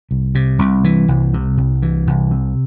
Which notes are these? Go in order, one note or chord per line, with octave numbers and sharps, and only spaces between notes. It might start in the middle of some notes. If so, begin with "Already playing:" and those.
C2
C3
C2
E3
C2
C3
C2
E3
C2
C3